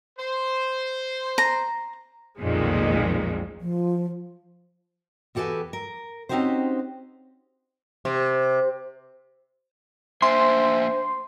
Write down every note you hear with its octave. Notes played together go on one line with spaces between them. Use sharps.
C5
A#5
B1 F2 A#2 D#3 F3 G#3
F3
E2 F#4 G4 A4 B4 G#5
A#4
C4 C#4 D#4 F#4 G4 C5
C3
A#3 D4 C5 E5 G#5 C6